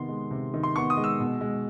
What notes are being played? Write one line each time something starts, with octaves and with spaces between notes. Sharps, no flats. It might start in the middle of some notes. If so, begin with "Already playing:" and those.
Already playing: C3 D#3 B3 C6
G#3
C3
D#3
C6
B3 C#6
D#6
G#3
E6
B2
G#3